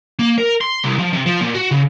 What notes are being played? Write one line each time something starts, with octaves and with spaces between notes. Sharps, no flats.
A#3
A#4
C6
C2
F3
C3
F3
A#2
F#4
C#3